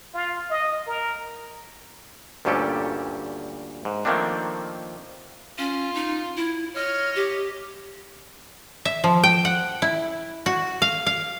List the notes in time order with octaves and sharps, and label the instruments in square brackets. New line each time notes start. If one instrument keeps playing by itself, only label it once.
[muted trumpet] F4
D#5
A#4
[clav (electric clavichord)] D2 G2 A#2 C#4 G4 A4
G#2
D#3 F3 A3 A#3 C4 D4
[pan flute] C#4 [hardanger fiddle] F4
[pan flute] D#4
E4
[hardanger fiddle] C#5 D#5 [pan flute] F6
[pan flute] G4
[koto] E5
F3
G5
F#5
E4
F#4
F5
F5